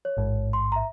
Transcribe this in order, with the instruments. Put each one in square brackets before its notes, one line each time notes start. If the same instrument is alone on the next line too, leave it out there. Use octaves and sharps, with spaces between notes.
[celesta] C#5
[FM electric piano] A1 G#2
[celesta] C6
E5 A#5